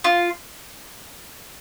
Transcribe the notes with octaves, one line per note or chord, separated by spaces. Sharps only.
F4